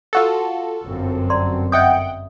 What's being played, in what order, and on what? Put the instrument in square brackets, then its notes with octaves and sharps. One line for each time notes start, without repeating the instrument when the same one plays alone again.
[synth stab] F4 F#4 A4
[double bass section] G1 F#2 C4
[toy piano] D5 A#5 C6
[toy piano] D#5 E5 D#6 [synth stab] F#5 G5 G6